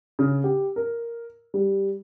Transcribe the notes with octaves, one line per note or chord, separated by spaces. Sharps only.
C#3
G4
A#4
G3